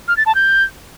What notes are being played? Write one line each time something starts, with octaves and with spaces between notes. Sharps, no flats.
F6
A6
A5
G6